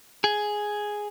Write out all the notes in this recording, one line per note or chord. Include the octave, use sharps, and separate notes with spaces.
G#4